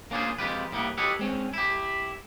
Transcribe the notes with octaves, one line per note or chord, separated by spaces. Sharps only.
A#3 C#4 D4 F4 G#4 C5
F2 C3 G#3 F4 G4 B4
A2 G3 A#3 B3
G4 A4 B4 C#5 D#5 F#5
G#3 C4 C#4
E4 G4